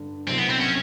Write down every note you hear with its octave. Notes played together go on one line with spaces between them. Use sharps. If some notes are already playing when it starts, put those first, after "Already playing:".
Already playing: G2 D3
C2 B2 F#3 C4
B3
C4
C#4